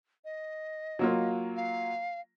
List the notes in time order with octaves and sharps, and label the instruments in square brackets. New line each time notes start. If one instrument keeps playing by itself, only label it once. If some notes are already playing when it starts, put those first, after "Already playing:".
[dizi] D#5
[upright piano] F#3 A#3 F4
[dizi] F5